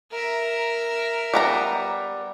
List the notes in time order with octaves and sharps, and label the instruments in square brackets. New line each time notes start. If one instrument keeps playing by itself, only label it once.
[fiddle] A#4 E5
[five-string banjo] G3 B3 A#5